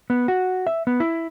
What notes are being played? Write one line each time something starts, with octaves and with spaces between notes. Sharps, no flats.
B3
F#4
E5
B3
E4